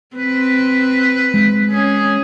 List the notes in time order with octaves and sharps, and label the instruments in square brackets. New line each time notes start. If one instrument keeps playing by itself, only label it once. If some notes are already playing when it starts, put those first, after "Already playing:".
[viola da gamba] C4 [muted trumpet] B4
[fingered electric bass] G#3
[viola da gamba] C#4 [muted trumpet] G#4